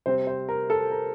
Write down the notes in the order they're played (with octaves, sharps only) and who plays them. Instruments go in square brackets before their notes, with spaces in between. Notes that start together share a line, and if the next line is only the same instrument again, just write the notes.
[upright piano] C3 G3 C4 C5
C5
A#4
A4
A#4